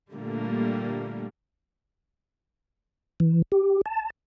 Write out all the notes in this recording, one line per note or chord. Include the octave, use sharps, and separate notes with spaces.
A#2 D3 G3 A3 A#3
E3
G4
A5